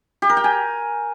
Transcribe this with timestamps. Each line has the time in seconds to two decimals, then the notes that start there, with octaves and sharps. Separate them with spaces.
0.22 G4
0.29 A#4
0.37 G5
0.44 G#5